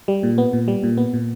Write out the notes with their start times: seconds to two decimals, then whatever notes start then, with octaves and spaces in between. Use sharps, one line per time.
0.08 G3
0.23 A#2
0.38 B3
0.53 A#2
0.68 G3
0.83 A#2
0.97 B3
1.14 A#2